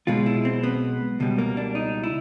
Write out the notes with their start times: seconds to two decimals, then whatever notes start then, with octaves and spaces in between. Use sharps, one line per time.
0.07 B1 B2 G#3 F4
0.26 E4
0.45 C4
0.64 B3
1.20 C#2 B2 G3
1.38 A#3
1.57 D4
1.75 D#4
2.03 E4